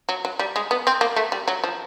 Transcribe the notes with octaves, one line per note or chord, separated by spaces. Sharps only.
F#3
F#3
G3
G#3
B3
C4
A#3
A3
G3
F#3
F3